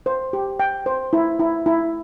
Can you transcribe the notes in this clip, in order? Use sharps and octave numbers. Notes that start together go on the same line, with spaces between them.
C5
G4
G5
C5
E4
E4
E4